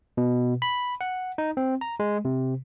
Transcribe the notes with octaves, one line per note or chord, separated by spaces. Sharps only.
B2
B5
F#5
D#4
C4
A#5
G#3
C3